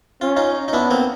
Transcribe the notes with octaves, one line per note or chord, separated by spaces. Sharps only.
C#4 F4
D#4 F4
D#4
B3 D4 E4
A#3 C4